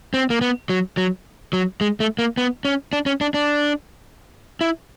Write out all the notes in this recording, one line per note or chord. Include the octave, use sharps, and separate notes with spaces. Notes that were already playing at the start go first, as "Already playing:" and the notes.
C4
A#3
B3
F#3
F#3
F#3
G#3
A3
A#3
B3
C#4
D4
C#4
D4
D4
E4